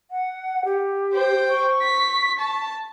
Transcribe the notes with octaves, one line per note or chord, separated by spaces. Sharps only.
F#5
G4
C5 G5
C#6
B6
A5